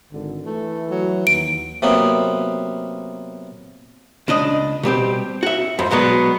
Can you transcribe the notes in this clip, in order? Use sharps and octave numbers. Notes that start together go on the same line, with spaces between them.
G#1 D3
E3 A3
F#3
D#2 D7
C3 F#3 A#3 B3
C#2 D4 D#5
B2 G3 C4 G4
F#4 E5
F2 G#2 C5
B1 F#3 G#3 B3 D5